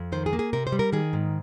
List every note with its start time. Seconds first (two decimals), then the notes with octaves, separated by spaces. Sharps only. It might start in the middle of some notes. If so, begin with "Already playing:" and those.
Already playing: F2
0.12 D#3 C5
0.26 G#4
0.33 A#3
0.39 G#4
0.53 C3 A#4
0.67 C5
0.72 G3
0.79 A#4
0.93 D#3 G#4
1.13 G#2